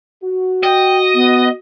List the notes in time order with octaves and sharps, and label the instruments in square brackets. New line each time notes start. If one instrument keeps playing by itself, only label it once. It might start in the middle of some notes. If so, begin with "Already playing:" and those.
[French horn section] F#4
[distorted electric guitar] D#5 [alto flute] G5
[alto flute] B3